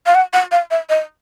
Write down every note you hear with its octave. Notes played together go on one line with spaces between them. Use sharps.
F5
F#5
F#5
F5
E5
D#5